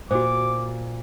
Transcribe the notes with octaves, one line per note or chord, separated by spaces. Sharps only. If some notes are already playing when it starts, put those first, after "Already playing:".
A#2 F#4 C5 D6